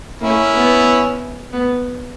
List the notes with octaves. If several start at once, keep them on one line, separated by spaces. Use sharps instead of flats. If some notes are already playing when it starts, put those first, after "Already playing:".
A#3 C#4 E4
B3
B3